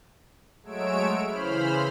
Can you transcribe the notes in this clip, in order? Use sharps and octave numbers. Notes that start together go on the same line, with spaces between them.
F#3 G#3 A3 C#5 E6 D7
C#3 E3 C5 B5 F6